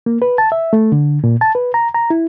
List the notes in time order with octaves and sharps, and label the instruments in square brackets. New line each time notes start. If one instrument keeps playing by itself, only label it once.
[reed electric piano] A#3
B4
A5
E5
A3
D3
A#2
A5
B4
A#5
A#5
E4